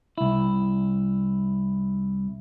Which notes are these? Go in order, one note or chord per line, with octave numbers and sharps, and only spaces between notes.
C2 E4